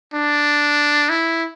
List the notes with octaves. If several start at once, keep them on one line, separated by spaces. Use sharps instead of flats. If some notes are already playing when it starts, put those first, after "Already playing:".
D4
E4